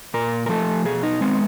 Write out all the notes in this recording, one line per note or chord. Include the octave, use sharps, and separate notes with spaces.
A#2 A#4
A#4
F3 A3 A4
B2 G#4
D#4
G#3 B3 C4